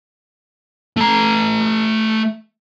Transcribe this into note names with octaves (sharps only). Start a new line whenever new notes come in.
A3 A#5